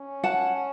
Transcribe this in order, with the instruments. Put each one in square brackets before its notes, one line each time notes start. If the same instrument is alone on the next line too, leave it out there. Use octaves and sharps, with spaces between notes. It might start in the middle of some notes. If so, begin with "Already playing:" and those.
Already playing: [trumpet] C#4
[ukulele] F#5 A5